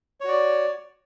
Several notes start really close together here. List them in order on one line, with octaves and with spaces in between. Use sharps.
C#5 F#4 D5